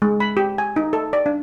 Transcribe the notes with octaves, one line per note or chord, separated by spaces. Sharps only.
G#3
B5
G4
G#5
D#4
A4
D5
D4